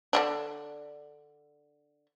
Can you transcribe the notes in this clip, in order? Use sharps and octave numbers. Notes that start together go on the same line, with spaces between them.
D3 D#3 D4